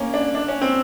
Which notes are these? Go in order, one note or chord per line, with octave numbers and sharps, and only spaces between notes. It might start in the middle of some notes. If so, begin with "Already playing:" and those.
Already playing: A#3 C#4
D4
D4
C#4
C4